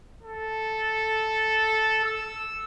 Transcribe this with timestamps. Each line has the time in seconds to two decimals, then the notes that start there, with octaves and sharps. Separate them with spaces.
0.23 A4
2.05 E6